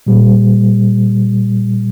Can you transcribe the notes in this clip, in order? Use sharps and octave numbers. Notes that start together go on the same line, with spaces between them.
A#2 G3